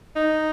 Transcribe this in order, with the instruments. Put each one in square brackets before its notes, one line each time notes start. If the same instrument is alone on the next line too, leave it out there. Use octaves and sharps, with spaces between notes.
[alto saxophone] D#4